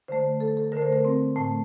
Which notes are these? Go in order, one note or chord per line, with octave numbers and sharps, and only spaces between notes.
D3 A3 C5
A4
A4
D3 A3 A#4
C5
A#4
C4
A2 A3